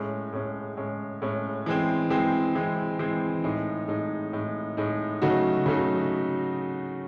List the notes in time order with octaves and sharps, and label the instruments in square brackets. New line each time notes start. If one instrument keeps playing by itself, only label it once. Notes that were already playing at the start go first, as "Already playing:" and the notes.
Already playing: [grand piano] A2 G#3 C#4
A2 G#3 C#4
A2 G#3 C#4
A2 G#3 C#4
E3 G#3 C4
E3 G#3 C4
E3 G#3 C4
E3 G#3 C4
A2 G#3 D#4
A2 G#3 D#4
A2 G#3 D#4
A2 G#3 D#4
C#3 F#3 A3 D#4 F#4
C#3 F#3 A3 D#4 F#4